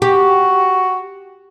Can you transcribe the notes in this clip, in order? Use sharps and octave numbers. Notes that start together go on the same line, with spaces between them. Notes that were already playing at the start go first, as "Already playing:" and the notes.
F#4 G4